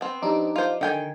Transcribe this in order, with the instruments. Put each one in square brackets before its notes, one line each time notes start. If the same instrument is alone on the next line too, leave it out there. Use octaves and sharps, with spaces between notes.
[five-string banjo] B3 C4
[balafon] F3 G4 [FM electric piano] D4 D#4 D6
[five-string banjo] F4 C5
[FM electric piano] D3 [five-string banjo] D#3 G5 G#5